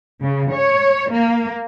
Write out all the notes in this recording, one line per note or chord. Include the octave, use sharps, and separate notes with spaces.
C#3
C#5
A#3